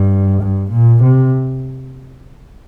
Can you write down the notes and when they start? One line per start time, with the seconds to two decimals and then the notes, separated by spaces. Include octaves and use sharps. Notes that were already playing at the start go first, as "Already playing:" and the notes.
Already playing: G2
0.41 G2
0.71 A#2
1.03 C3